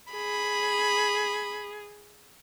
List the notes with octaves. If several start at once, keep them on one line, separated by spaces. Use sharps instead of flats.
G#4 B5